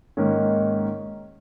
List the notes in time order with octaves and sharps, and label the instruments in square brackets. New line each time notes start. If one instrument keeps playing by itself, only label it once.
[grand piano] G#2 D#3 A#3 C#4